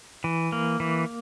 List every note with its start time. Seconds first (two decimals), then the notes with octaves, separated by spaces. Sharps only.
0.24 E3
0.52 A#3
0.80 E3